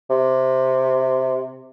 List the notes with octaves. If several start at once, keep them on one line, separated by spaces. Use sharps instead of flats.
C3